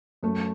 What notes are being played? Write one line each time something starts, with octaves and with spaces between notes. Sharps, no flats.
F#2 A3